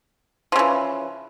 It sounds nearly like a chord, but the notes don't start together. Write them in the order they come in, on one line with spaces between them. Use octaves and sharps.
F3 C#3 E3